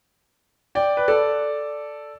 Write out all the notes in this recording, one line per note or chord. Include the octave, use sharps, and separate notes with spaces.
D5 G5
B4
A4 D5